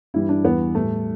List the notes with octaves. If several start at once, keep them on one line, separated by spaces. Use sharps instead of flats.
G2 E3 G3 E4
D4
E2 E3 G3 B3
A2 G3 A3